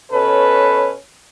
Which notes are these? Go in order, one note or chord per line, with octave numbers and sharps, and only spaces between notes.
B2 C#4 A4 B4 C#5